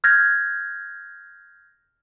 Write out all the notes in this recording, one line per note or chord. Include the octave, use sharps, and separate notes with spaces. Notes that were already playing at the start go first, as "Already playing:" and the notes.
F6 G6 G#6 A#6